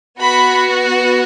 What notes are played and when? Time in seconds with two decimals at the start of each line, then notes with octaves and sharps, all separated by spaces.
0.20 B3 F#4 B5